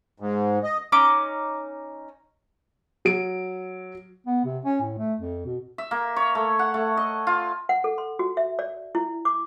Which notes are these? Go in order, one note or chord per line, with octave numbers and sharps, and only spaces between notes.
G#2
D#5
C#4 D#4 D6
F#3 D7
B3
C3
C#4
A2
A3
F2
B2
E5
A#3
C#5
A3
F#5
A3
D#5
F4
F#5
A4
C6
F#4
E5
D5
E4
D6